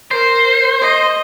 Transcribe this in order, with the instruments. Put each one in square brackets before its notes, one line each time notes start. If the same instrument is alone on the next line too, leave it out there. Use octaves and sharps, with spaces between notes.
[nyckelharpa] A#4 [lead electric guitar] C5
[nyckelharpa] D#5